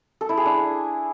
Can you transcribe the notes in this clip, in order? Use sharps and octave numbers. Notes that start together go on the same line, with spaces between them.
A4
E4
G#4
D4